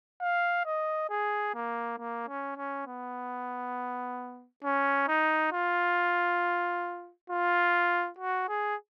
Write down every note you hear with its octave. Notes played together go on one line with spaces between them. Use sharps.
F5
D#5
G#4
A#3
A#3
C#4
C#4
B3
C#4
D#4
F4
F4
F#4
G#4